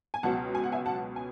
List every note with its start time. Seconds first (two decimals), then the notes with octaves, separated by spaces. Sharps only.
0.14 G#5
0.23 C#2 B2 F#3 F#5 A5
0.55 G#5
0.64 F#5
0.72 E5 G#5
0.86 F#5 A5
1.16 G#5